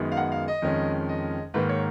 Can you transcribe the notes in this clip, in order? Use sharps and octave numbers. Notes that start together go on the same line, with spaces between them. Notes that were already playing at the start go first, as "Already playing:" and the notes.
Already playing: F#2 D#3 G#3 B3 D#4
F5
F#5
F5
D#5
F2 D#3 G#3 C#4
D#5
G#2 D#3 A#3 B4
C#5